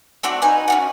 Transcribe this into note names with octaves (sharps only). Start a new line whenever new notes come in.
A3 C4 F#4 D5
D#4 B4 G#5
C#4 D#4 F#4